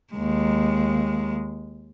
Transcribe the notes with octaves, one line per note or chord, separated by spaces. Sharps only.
D#2 G#3